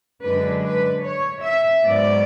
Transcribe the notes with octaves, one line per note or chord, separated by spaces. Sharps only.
F#2 D3 G#3 D4 B4
B4
C#5
E5
G#2 F#3 B3 D5